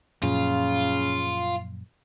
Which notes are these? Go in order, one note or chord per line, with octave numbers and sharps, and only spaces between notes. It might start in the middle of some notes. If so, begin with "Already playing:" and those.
F#2 A#2 C#3 F3 F4